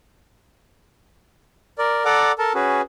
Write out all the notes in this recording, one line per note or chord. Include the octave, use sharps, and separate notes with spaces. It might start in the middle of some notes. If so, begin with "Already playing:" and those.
A#4 D5
A4 D5 F#5 A#5 D6
A4 A#4 A5
C#4 F#4 G#4 B4